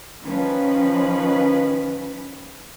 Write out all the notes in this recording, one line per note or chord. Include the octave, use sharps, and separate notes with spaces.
D#3 F3 C#4 B4